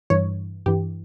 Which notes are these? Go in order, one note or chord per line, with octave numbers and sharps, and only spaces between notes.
G2 E3 C#5
G2 E3 G4